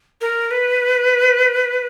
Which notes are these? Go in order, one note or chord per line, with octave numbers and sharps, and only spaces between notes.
A#4
B4